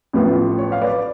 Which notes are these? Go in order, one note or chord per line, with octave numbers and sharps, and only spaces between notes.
A1 A2 F3 B3 F4
C#5
F5
B4 D5